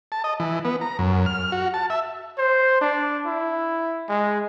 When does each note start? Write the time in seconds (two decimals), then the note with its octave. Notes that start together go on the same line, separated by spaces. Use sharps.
0.12 A5
0.24 D#5
0.40 E3
0.65 B3
0.81 A#5
0.99 F#2
1.26 F6
1.52 F#4
1.74 A5
1.90 E5
2.38 C5
2.81 D4
3.26 E4
4.09 G#3